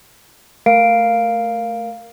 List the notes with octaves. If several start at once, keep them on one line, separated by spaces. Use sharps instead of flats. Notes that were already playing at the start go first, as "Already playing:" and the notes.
A3 A#4 F5 C7 D7